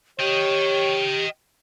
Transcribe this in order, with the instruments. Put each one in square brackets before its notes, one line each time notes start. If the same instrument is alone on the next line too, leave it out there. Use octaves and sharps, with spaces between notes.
[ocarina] G4 [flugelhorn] C#5 [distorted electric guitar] D#5 G5